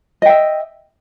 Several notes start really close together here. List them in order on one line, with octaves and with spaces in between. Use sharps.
D#5 G5 E5